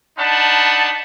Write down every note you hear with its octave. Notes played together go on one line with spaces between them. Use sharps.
D4 D#4 F#5 A5 B5